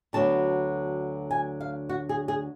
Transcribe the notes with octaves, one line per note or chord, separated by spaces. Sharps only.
D2 D3 F#3 B3 A5
G#5
F5
F#4
G#4
G#4